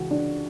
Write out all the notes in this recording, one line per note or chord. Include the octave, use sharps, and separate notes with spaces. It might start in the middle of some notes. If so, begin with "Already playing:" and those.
Already playing: C#2 C#3 E3 F#4
D4